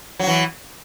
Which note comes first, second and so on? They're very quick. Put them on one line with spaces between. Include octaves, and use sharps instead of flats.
F#3 F#4 E3